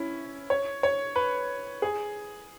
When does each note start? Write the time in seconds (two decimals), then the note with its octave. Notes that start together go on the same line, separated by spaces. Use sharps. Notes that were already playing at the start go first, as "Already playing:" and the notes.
Already playing: C#4 E4
0.50 C#5
0.83 C#5
1.16 B4
1.82 G#4